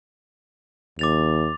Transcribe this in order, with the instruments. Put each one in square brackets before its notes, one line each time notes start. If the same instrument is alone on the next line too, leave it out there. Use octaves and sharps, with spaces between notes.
[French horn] D#2 [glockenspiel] D6 A6 F7